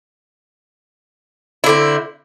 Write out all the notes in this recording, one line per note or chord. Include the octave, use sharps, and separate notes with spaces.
D3 C4 E4